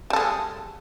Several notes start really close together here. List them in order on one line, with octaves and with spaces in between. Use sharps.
G3 A4 G#3